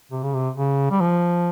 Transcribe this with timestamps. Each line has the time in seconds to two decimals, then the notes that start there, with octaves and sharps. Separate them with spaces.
0.12 C3
0.23 C#3
0.34 C3
0.56 C#3
0.91 G3
1.00 F3